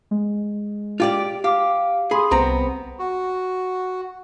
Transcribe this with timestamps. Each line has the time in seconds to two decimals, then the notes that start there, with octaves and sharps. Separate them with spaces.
0.11 G#3
1.00 F4 G4 D5
1.44 G4 F5 D6
2.11 G#4 B5 C6 D#6
2.31 C2 B3 C4 A#5
2.99 F#4